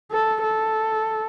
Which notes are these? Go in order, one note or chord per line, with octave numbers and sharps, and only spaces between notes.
A4
A4